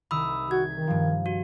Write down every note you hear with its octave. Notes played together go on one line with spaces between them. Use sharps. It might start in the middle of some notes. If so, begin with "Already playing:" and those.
C2 D#3 B5 D#6 E6
F#4 G#4 G#6
D#3 B6
G2 F3
F#4